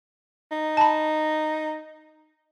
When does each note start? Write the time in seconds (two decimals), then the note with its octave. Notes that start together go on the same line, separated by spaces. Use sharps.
0.52 D#4
0.77 A5 B5